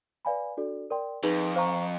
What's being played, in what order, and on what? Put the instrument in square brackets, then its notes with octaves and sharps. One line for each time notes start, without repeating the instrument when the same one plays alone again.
[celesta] B4 D5 F5 G#5 B5
D4 F#4 A4 D5
A#4 D5 G5 C6
[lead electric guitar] F2 [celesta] D#4 G#4 B4
[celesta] C5 F5 A#5 C#6